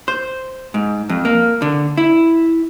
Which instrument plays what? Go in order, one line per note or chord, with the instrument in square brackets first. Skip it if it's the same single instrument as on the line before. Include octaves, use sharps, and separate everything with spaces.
[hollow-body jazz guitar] C5
G#2
F2
A#3
D3
E4